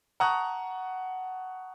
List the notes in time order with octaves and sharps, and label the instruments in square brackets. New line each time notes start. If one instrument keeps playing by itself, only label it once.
[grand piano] F#5 A5 A#5 C#6 D#6 F#6